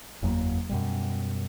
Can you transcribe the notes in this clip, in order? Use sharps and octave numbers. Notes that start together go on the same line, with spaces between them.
F#1 E2 F#3 A#3
F#2 B2 G3